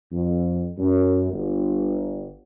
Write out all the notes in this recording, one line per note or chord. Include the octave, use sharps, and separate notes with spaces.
F2
F#2
G1